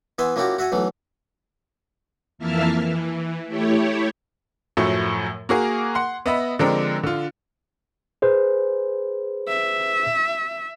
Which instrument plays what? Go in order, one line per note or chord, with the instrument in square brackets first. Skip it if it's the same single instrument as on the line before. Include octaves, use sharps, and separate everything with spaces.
[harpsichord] E3 B3 E5 G#5 C6
F3 A#3 C#4 E4 F#4 G4
F#4 E5 F#5 G#5
B1 E3 F#3 A3
[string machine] F2 E3 A#3 E5 A5 F6
E3
A3 E4 G4 C#5
[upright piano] F#2 A2 F3 F#3 A3
A#3 F#4 G#4 A#4
F#5 C6
B3 D#5 E5 B5
D3 F3 G#3 C4 D4 A#4
D3 F4
[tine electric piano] G#4 B4 C5
[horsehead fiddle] E5